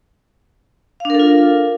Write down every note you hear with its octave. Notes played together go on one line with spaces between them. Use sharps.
D4 F4 A4 A#4 F5